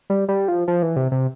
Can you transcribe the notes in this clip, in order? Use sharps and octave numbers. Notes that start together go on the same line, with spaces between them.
G3
G3
F3
F3
E3
C3
C3